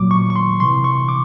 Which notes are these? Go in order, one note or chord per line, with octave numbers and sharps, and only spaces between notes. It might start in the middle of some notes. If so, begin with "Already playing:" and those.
Already playing: A#2 F#3 D6
C#6
C#6
C6
C3 E3 C6
C#6
D6